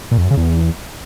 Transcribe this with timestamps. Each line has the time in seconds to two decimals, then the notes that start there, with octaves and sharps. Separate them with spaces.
0.11 A#2
0.18 F2
0.24 F#2
0.31 C#3
0.37 E2